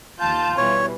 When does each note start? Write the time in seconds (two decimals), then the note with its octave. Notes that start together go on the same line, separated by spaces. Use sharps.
0.19 D#2 F4 A5 G6
0.58 B2 E3 G3 C#5